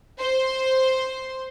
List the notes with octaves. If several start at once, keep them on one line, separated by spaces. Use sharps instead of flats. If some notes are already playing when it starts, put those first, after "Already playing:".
C5 C6